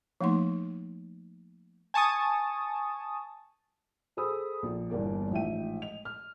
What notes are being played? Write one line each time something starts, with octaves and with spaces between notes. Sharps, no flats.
F3 A3 A#3 D#4 C6
G#5 A5 C#6 D#6
G#4 A4 C5 B5 D#6 E6
A#1
G1 E2 A#3 D5
A1 G#2 F3 E5 G5 D#7
D#5 F7
F6